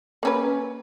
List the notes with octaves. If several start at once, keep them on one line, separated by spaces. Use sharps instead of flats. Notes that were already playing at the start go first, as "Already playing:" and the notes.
A#3 C#4 B4